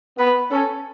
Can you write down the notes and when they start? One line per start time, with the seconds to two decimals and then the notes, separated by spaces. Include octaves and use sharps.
0.18 B3 B4
0.51 C#4 A4